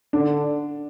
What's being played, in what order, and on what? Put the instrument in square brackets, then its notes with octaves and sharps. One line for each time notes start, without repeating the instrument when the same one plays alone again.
[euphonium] D3 [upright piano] D4